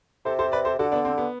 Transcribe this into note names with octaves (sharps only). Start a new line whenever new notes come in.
C3 A4 C5
A4 C5
B4 D5
A4 C5
D3 F#4 A4
B3 D4
C4
B3